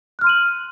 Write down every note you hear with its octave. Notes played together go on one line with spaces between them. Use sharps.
C6 F6 F#6 D#7 F#7